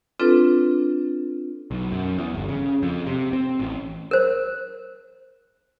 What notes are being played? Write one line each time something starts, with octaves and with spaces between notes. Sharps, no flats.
C4 D4 F4 A4 B4
B1
F#2
E2
G1
C#3
F2
C3
C4
A1
A#4 C5